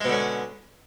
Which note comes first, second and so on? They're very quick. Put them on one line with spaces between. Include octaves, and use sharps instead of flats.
G#3 B2 D3 C#4